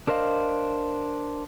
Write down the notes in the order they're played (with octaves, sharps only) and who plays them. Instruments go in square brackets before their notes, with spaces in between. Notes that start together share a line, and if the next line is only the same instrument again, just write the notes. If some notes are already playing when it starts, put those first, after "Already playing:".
[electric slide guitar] D4 A#4 C5 D#5 F5